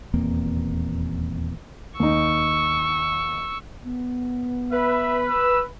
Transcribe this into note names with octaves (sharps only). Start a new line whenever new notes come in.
D#1 E2 A#3 C4
D#2 D#4 C#6 E6
B3
B4 E5
E6